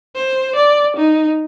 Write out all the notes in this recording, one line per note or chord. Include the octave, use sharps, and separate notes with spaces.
C5
D5
D#4